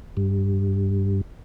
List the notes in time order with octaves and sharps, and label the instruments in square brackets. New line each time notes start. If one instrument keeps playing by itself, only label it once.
[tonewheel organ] G2